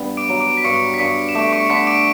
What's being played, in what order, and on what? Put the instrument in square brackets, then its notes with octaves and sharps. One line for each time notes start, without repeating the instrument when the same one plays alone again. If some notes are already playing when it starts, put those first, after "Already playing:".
Already playing: [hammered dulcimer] G2 B3
[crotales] D6 D7
[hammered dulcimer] F#3
[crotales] D6 D7
B6
[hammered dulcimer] G2 [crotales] C#6 C#7
[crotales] B6
[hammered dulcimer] G2 [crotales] C#6 C#7
[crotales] E7
[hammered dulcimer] A3 [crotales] D6 D7
[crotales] C#6 C#7
C#7
[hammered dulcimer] D3 [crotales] B6
[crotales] D6 D7